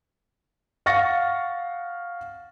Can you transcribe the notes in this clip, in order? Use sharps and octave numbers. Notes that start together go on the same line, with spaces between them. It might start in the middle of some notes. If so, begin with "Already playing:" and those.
F5 F#5 C#6 A6 A#6 C#7